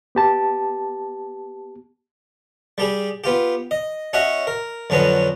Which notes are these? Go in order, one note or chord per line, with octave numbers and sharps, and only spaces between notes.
B3 G4 A5
G3 G4 G#4
B3 F4 G4
D#5
C#4 F#4 C#5 D#5 E5 F#5
A#4
F2 D3 F#3 C#4 B4 D#6